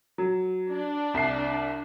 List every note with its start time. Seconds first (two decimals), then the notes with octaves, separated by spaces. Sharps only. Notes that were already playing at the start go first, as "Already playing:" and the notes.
0.18 F#3
0.71 D4
1.14 C2 C7